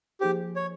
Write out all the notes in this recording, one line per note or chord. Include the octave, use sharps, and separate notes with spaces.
F3 A#3 D#4 G4 G#4 C5
C#5